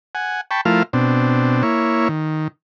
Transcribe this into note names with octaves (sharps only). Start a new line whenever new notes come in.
F#5 G#5
G5 A5 B5 C#6
F3 A3 E4 F4 A#4 F5
B2 C4 D4
A#3 E4 C#5
D#3